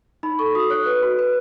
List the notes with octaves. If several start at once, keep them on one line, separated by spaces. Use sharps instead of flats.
D#4 B5
A4 C#6
F#4 D#6
C#5 F#6
B4
F#4
B4